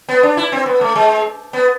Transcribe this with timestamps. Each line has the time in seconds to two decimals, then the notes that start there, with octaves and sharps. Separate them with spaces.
0.09 B3
0.23 D4
0.37 E4
0.52 C4
0.66 B3
0.81 A3
0.96 G#3
1.53 B3